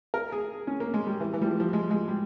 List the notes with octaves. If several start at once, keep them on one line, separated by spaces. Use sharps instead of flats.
A#4
G#4
C#4
A#3
G#3
G3
E3
E3
G3
F3
F3
G#3
G#3
G3